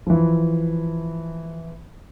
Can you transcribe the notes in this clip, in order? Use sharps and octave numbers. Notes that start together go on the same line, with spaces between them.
E3 F3